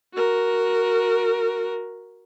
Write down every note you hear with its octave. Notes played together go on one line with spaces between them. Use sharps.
F#4 A#4